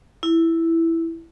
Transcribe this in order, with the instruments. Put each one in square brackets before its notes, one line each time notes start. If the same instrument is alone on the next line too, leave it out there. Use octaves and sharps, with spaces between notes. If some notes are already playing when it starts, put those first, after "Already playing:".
[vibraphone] E4